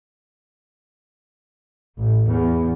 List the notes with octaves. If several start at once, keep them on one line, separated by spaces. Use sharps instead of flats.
A1
E2